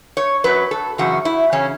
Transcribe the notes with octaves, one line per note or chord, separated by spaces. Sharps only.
C#5
F#2 F#3 B4
A4
F#2 C#3 E3 F#4
E4
C#3 E3 C#4